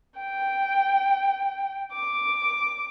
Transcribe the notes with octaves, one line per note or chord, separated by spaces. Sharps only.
G5
D6